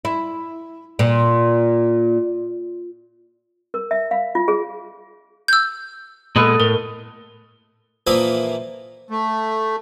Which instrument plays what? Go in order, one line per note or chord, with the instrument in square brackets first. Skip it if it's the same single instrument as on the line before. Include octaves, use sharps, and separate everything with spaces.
[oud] E4
A#2
[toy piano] A#4
E5
F5
F4
G#4
[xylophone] E6 G6
[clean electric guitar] A#2 G#3 B3 [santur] A4 B4 D#5
[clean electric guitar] A2 [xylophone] A#4
[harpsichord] A#2 E3 F3 A#3 E5 D#6
[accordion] A3